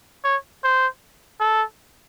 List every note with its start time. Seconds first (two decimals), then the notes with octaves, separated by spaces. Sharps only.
0.25 C#5
0.64 C5
1.40 A4